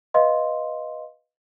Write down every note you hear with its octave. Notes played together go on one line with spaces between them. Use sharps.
B4 D#5 F5 C6